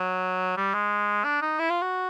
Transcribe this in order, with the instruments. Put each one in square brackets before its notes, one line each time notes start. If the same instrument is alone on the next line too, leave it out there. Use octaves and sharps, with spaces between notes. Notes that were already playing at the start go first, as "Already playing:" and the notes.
Already playing: [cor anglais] F#3
G3
G#3
D4
D#4
E4
F4
F#4